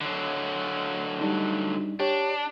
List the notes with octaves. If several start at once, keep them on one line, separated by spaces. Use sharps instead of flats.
D3 F#3
G3 D4 D#4
D4 G4 C#5